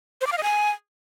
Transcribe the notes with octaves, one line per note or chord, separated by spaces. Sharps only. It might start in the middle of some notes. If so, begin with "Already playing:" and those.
C5
D6
F5
D#5
G#5